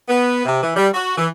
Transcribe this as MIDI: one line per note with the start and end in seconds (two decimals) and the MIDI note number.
0.09 0.41 59
0.45 0.62 48
0.63 0.74 52
0.76 0.88 55
0.94 1.17 66
1.18 1.27 52